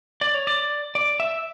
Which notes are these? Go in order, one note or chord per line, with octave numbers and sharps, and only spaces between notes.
D5
C#5
D5
D5
E5